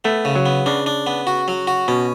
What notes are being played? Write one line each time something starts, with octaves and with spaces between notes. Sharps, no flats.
A3 B3
C#3
F#3
B3
C#3 D4
D4
B3
F#4
F#3
F#4
B2 C#4